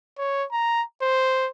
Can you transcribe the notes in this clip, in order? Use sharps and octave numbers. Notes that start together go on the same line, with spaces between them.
C#5
A#5
C5